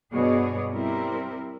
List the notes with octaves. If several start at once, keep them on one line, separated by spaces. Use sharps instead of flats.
G2 B2 B3 G#4 C#5 D5
G3 C4 E4 A#4